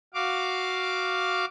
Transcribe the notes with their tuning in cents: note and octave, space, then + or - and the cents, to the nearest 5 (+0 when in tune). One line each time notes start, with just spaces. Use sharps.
F#4 +0 F5 +0 D6 +0